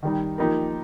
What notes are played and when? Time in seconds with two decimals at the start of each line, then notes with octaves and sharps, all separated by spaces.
0.03 D#3 G3 D#4
0.38 F3 A#3 D#4 G4 A#4